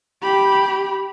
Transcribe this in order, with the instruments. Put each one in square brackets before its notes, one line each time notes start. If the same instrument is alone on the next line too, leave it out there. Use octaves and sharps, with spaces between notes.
[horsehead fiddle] G4 B5